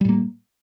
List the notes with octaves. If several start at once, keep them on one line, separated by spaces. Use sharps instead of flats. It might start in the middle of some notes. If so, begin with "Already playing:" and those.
A2 G3 A#3